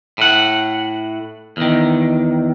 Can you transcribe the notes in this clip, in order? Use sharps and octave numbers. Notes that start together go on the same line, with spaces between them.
A2 F#5
E2 D#3